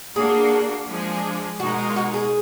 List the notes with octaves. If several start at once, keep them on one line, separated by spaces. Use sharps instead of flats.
A#3 D4 F#4 G#4
F3 G#3 D4 G#4
B2 G#3 D#4 F#4 A#4
F4
F#4
G#4